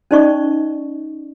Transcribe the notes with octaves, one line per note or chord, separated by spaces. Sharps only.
C#4 D#4 C5 D5 D#5 C#6